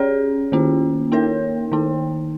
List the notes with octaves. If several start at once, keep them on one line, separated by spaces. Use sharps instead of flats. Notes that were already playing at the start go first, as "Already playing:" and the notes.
Already playing: C#4 G#4 C#5
D#3 A#3 C#4 F4
A#3 D#4 A#4 C#5
D#3 A#3 D#4